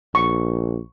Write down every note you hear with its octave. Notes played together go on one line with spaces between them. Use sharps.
A#1 C#6